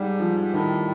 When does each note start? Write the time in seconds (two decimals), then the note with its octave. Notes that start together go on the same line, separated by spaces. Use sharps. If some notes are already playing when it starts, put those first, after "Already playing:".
Already playing: G#2 G3
0.20 F3
0.53 A2 D#3